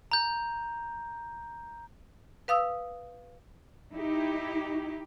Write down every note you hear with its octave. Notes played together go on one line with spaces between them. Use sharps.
A#5 G6
B4 F5 D#6 E6
D#4 E4 G4